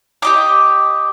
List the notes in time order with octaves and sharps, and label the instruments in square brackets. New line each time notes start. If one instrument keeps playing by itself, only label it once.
[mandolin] G4 D#5 D6